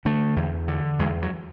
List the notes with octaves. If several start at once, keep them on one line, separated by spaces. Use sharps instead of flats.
D3 A3
E2
D3
E2 G#3
F#3